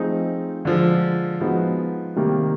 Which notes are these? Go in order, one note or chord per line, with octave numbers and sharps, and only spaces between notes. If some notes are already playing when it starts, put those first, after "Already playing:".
Already playing: F3 A3 C4 D#4 G#4
D3 F3 G#3
F3 G#3 B3 D#4 F#4
C3 D#3 G3 A#3